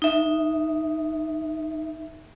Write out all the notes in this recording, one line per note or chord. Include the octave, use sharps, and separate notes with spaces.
D#4 E5